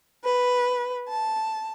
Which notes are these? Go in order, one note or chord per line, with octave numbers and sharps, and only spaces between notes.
B4
A5